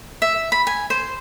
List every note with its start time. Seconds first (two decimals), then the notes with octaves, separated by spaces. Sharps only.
0.22 E5
0.52 B5
0.67 G#5
0.90 C5